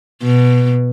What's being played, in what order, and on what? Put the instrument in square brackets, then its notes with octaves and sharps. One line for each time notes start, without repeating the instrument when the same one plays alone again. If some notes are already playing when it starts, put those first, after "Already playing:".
[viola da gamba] B2